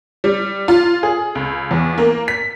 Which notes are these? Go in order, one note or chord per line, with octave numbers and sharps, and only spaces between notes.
G3
F4
G#4
C#2
E2
A#3
B6